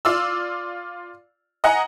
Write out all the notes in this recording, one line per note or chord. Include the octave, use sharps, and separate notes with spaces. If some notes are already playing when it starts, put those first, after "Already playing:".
F4 D5 E6
D#5 F#5 G#5 A#5